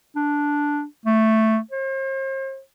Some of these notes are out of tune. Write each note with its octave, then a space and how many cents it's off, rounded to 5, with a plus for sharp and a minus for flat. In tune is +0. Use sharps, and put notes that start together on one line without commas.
D4 -5
A3 +5
C5 +40